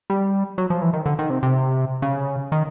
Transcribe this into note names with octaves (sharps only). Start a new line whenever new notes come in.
G3
F#3
F3
E3
D#3
D3
D#3
C3
C3
C#3
D#3